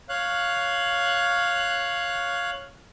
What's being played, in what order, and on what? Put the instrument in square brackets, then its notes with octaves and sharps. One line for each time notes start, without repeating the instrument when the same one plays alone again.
[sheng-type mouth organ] C#5 F5 F#6